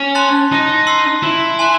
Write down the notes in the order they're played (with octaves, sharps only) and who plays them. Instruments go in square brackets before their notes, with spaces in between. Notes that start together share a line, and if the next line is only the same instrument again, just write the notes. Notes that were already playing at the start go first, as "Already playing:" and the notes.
Already playing: [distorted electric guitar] C#4
[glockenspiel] A5 C6 F#6 A6
[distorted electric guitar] D#4
[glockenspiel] C6 E6 C7
[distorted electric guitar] E4
[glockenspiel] G#5 C6 F#6